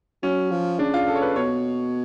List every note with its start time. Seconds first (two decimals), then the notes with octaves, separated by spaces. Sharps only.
0.23 F#3 C#4
0.51 F3
0.79 C#3 D4
0.94 F4
1.08 A4
1.15 C#5
1.22 B4
1.36 B2 C#5